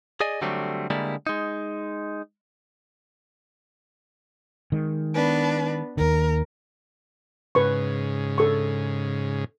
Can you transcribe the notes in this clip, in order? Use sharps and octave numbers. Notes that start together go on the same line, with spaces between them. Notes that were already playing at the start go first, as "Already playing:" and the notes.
G#4 D5 D#5 G#5
D3 F#3 G3 A3 C4
D3 G3 G#3 A#3 E4
G#3 D#4
D#3 G#3
B3 D4 B4
D#2 D#3 A#4
G#2 C#3 B4 C#6
A4 C#6